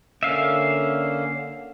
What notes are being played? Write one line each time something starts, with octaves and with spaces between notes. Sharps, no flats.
D3 A#3 C#4 E5 F5